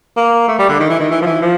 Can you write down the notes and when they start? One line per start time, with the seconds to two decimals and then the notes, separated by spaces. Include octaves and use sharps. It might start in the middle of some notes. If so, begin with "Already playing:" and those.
0.17 A#3
0.48 A3
0.59 G3
0.69 D3
0.80 D#3
0.90 E3
1.00 D#3
1.11 E3
1.22 F3
1.26 E3
1.41 F3